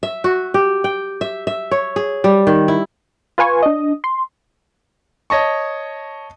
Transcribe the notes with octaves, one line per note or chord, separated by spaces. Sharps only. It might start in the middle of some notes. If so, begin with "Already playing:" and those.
E5
F#4
G4
G5
E5
E5
C#5
G#4
G3
D#3
E4
F4 B4 G#5 C#6
D4 D#5
C6
C#5 D#5 A5 C#6